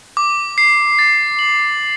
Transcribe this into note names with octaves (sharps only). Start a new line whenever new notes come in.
D6
C7
A6
F#7
D6